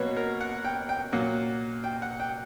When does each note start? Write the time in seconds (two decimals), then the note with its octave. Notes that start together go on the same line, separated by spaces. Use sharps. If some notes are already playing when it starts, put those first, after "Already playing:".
Already playing: B2 F#3 A#3 B4 C#5
0.17 A#4
0.41 F#5
0.65 G5
0.89 G5
1.12 A#2 F#3 A#3 F#5
1.84 G5
2.02 F#5
2.20 G5